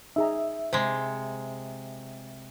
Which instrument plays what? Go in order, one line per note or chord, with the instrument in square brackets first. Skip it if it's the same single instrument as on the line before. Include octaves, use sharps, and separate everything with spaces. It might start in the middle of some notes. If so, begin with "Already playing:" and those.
[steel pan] D#4 G#4 A#5 [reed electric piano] E5
[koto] C3 G#3 [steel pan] C5